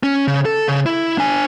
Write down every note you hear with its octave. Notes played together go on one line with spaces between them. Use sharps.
C#4
C#3
A4
C#3
E4
D4 G#5